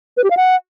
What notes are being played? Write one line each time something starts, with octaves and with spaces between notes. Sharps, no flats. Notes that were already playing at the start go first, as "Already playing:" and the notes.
B4
G4
F5
F#5